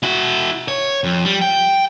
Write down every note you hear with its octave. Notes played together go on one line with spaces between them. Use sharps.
E4 F#4
C#5
F2
G3
G5